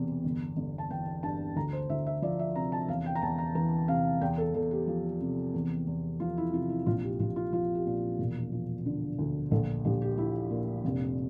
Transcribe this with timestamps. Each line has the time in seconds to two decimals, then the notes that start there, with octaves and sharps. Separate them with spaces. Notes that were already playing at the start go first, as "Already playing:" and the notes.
Already playing: E1 E2 C3 E3
0.24 G1
0.57 G1
0.78 A5
0.91 E3 G5
1.23 G2 A5
1.56 D2 A#5
1.73 C5
1.90 D2 E5
2.06 E5
2.22 F3 D5
2.39 E5
2.56 C3 A#5
2.72 A5
2.88 E2 F5
3.06 G5
3.15 A#5
3.22 E2 A5
3.38 A#5
3.55 E3 A#5
3.88 C3 F5
4.21 E2 G5
4.38 A4
4.54 E2 A4
4.71 G4
4.87 F3
5.21 C3
5.54 E2
5.87 E2
6.20 F3 F4
6.37 E4
6.53 C3 F4
6.70 E4
6.86 A#1 F4
7.03 G4
7.20 A#1 F4
7.36 F4
7.53 F3 F4
7.75 G4
7.86 A#2
8.19 E1
8.52 F3
8.86 D3
9.19 D2
9.51 A#1 A4
9.84 A#1 G4
10.02 G4
10.18 F3 E4
10.51 A#2
10.85 F1